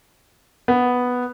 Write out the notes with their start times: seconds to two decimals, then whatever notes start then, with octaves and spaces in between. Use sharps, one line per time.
0.68 B3